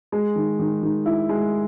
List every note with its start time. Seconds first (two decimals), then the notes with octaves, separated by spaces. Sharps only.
0.12 G#3
0.36 D#3
0.59 D#3
0.83 D#3
1.06 E4
1.29 G#3